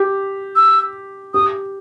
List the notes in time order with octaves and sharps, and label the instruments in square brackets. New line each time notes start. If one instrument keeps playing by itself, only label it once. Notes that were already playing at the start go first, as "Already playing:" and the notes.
Already playing: [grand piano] G4
[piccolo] E6
[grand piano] G4 [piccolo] D#6